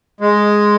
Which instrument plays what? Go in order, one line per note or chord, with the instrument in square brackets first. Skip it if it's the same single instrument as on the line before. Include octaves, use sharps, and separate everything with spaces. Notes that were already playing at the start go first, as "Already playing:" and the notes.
[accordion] G#3